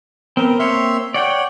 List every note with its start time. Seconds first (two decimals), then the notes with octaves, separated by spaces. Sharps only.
0.37 B3 C4 A#4
0.59 A#3 C4 C#5 E5 C6
1.14 C#5 D5 F#5 G5